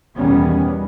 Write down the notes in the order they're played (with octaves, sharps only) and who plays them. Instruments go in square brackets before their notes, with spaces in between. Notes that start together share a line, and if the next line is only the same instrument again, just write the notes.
[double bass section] E2 B2 D#3 G3 B3 C#4